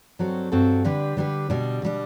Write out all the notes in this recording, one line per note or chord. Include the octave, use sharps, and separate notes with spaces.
G2 F#3 C4 F#4 A4
G2 F#3 C4 F#4 A4
D3 G3 D4 G4 B4
D3 G3 D4 G4 B4
B2 G3 D4
B2 G3 D4